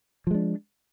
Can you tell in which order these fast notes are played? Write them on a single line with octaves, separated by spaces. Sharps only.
F3 G#3 D4